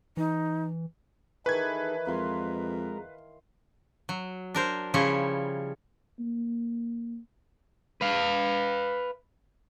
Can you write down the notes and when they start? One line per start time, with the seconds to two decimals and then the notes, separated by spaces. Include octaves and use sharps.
0.17 E3 D#4
1.46 D#3 E3 D#4 G#4 A4 B4 C#6 G#6
2.07 F2 G#3 A#4 F5 C6
4.09 F#3
4.55 D4 A#4 C5
4.94 C#3 F3 G3 E4 C#5
6.19 A#3
8.01 B4 F5